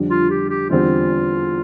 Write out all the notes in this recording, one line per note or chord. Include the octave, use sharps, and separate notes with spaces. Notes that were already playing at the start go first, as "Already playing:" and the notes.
Already playing: F2 D3 G3 D4
F4
G4
G4
E2 D3 G3 C4 F4